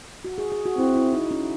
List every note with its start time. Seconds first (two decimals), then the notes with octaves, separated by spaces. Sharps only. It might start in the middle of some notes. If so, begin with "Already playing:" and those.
0.25 F#4
0.38 G#4
0.52 G#4
0.65 F#4
0.77 C4 E4
0.96 E4
1.13 D#4
1.31 C#4